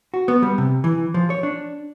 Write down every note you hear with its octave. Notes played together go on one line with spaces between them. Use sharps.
F#4
B3
G3
C3
E3
F3
C#5
D4